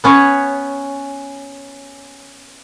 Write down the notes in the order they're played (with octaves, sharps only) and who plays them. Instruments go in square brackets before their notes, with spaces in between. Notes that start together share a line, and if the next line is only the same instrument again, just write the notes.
[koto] B3 C#4 B4 C#5